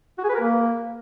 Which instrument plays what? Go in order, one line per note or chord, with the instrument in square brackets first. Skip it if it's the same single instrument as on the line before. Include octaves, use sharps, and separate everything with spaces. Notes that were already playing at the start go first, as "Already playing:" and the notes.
[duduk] F#4
G#4
B4
A#4
A#3